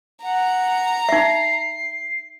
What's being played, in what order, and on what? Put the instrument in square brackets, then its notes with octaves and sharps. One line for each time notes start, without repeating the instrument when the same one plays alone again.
[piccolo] F#5 [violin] A#5
[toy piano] D#4 E5 [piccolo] C7